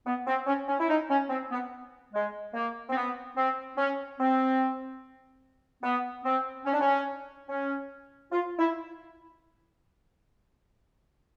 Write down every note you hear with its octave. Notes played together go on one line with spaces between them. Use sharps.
B3
C4
C#4
C#4
E4
D#4
C#4
C4
B3
G#3
A#3
C4
B3
C4
C#4
C4
B3
C4
C#4
D4
C#4
C#4
F4
E4